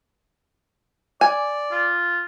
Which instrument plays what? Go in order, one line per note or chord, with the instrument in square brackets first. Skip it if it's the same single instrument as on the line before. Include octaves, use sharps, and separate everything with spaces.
[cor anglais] D5 [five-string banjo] G#5
[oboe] F4